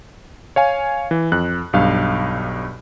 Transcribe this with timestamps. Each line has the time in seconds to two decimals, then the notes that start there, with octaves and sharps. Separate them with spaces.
0.56 C#5 F5 G#5
1.11 E3
1.32 F2 F#6
1.73 B1 G2 F5